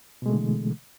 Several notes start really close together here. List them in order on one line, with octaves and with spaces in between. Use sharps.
B2 G#3 A3 D3 E3